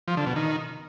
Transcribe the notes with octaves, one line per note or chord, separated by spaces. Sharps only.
F3
D3
B2
D#3